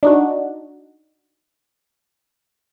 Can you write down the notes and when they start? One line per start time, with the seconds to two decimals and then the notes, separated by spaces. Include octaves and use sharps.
0.03 D4 D#4 F#4